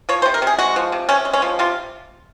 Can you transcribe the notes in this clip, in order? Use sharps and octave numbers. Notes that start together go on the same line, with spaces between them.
F3 C#5
C5
C3
A#4
C3 G#4
G#3 F#4
F3
C3
C3 C#4
G#3
C#4
F3
C3 F4